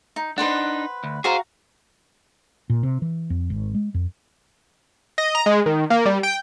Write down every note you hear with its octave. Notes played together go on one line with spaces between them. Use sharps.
D#4
D4 D#4 B4 C5 F#5
D2
F#4 G#4 C5 F5 A#5
A#2
C3
E3
F2
G#1
G#3
F2
D#5
A#5
G#3
D#3
A#3
G3
G5